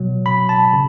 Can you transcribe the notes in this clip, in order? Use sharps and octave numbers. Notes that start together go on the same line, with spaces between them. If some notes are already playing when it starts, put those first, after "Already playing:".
Already playing: B2 F#3
B5
A5
C#3